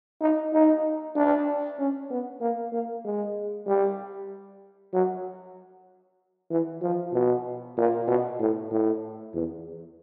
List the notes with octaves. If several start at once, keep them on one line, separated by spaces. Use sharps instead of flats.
D#4
D#4
D4
C#4
B3
A#3
A#3
G#3
G3
F#3
E3
F3
B2
A#2
B2
A2
A2
E2